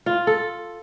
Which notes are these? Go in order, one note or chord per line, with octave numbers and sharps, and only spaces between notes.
F4
A4